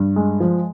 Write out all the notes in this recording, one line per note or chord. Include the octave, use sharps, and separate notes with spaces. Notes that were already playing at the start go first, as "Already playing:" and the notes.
Already playing: G2
G#3
F3